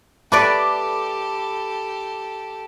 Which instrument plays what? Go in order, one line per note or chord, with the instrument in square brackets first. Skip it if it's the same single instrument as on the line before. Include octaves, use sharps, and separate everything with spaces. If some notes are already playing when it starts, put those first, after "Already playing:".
[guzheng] A3 B4 D5 [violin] G4 A4 [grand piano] A5 B5 D6